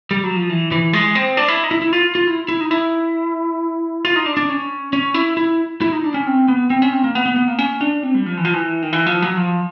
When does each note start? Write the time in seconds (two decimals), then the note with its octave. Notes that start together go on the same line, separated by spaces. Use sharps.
0.11 G3
0.23 F#3
0.36 F3
0.50 E3
0.72 E3
0.93 G#3
1.15 C4
1.37 D4
1.48 E4
1.64 D#4
1.71 E4
1.82 E4
1.93 F4
2.15 F4
2.27 E4
2.48 E4
2.61 D#4
2.71 E4
4.05 F4
4.16 D#4
4.26 D4
4.37 D4
4.49 C#4
4.93 C#4
5.14 E4
5.37 E4
5.82 E4
5.92 D#4
6.04 D4
6.14 C#4
6.27 C4
6.48 B3
6.70 C4
6.82 C#4
6.93 C4
7.04 A#3
7.15 B3
7.26 B3
7.36 B3
7.48 A#3
7.59 C#4
7.81 D4
8.03 C4
8.14 G3
8.26 F3
8.37 E3
8.45 F3
8.54 E3
8.82 D#3
8.93 E3
9.06 F3
9.22 F#3
9.37 F3